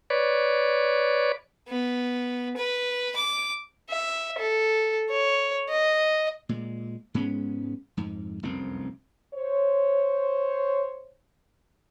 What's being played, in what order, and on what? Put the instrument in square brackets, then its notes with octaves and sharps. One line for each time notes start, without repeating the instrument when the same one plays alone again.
[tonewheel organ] B4 C#5 D5
[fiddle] B3
B4
D6
E5
A4
C#5
D#5
[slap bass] A#2 G#3
G#2 G#3 B3 C#4
F2 G#2
F1 C2 F#2 C4
[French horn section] C5 C#5